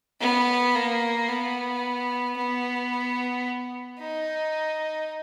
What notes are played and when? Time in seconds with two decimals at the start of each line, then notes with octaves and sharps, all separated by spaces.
0.21 B3
0.75 A#3
1.29 B3
2.37 B3
3.99 D#4